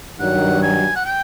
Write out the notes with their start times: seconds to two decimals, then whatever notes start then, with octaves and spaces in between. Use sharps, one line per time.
0.19 G2 D#3 F#3 F#5
0.62 G#5
0.96 F#5
1.06 G5